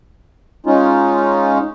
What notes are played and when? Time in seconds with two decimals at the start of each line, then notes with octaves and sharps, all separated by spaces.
0.66 G#3 C#4 D#4 F4